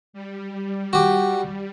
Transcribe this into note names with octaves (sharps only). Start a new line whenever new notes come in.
G3
F#4 G4